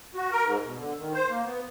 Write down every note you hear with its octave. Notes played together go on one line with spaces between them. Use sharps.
F#4
A#4
G#2
B2
D3
D#3
C5
A#3
B3